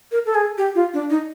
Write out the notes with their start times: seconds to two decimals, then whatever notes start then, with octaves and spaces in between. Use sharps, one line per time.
0.12 A#4
0.26 A4
0.35 G#4
0.58 G4
0.75 F4
0.94 D4
1.10 D#4